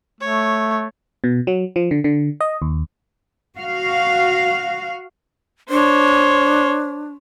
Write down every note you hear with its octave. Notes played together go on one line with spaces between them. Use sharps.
A3 C#5
B2
F#3
F3
D3
D3
D#5
D#2
F#4 F5
D4 C5 C#5